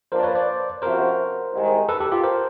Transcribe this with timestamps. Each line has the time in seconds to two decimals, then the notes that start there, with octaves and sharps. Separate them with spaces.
0.12 F3 A#3 D4 A#4 C5
0.23 B4 C#5
0.35 C5 D5
0.82 C3 F3 A3 C#4 F#4 A#4 C5
1.52 C2 C3 D#3 G#3
1.89 A4 B4
2.00 G4 A4
2.12 F4 G4
2.23 A#4 C5